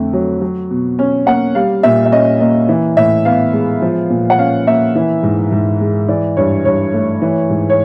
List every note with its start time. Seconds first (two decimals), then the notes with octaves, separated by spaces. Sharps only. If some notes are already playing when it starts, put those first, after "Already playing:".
Already playing: F2 D3 A3
0.13 F#3
0.41 F#3
0.71 B2
0.99 C#4
1.26 A#3 F#5
1.55 G3 F5
1.83 A#2 E5
2.06 E5
2.12 C#4 D#5
2.40 A#3 D#5
2.69 E3
2.97 A2 E5
3.25 B3 F5
3.53 G#3
3.82 F3
4.10 A#2
4.30 F#5
4.38 C#4 F5
4.67 A#3 E5
4.95 E3
5.23 G#2
5.52 G#2
5.81 G#3
6.08 E3 D5
6.37 G2 C#5
6.65 G2 C#5
6.94 A3
7.22 E3
7.50 G#2
7.70 C#5